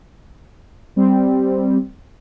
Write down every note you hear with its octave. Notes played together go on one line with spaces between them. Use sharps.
G3 C4